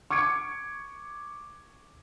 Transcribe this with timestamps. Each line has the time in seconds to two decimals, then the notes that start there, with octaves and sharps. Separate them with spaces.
0.10 C#6 D6 G#6 C#7 D7